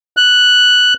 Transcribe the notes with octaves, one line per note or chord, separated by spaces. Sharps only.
F#6